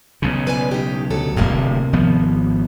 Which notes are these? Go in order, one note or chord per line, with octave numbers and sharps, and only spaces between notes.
B1 C#3
B4 D5 G#5
D#4 G4
D2 F#3 A4
D1 G#1 E2 A2 C3 A#3
G#1 F3 B3